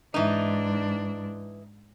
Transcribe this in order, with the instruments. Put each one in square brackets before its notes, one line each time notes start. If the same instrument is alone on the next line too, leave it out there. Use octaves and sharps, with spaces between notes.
[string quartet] G#2 D4 [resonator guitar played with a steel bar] E3 D#4